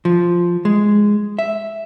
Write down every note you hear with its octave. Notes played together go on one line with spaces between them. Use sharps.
F3
G#3
E5